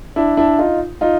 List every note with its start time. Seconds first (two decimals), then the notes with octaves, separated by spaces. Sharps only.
0.16 D4 E4
0.37 D4 E4
0.59 D#4 F4
1.01 D#4 F4